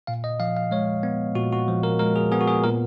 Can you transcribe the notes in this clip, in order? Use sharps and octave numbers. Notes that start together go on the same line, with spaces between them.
A#2 F5
D#5
F3 F5
F5
G#3 C#5
B3
A#2 F#4
F#4
F3
A#4
G#3 A#4
G#4
B3 G#4
F#4
G#4
A#2 A#4